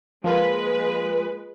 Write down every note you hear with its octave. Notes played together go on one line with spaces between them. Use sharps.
F3 G#3 A#3 F4 B4